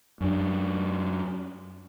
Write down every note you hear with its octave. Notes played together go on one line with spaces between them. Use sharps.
F#2 D4